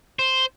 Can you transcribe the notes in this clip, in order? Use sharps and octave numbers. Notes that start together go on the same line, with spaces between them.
C5